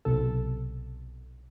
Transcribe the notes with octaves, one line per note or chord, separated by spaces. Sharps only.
B1 C3 A4